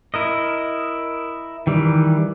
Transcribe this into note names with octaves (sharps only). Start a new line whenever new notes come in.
E4 A#4 D#5
D#3 E3 G3